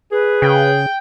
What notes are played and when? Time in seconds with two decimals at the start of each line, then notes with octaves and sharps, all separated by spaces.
0.12 G#4 B4
0.42 C#3 G5